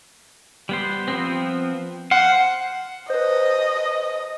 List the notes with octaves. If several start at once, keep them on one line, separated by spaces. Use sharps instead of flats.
G3 B3 C5
F3 B3 C4
C5 F5 F#5
B4 C5 D#5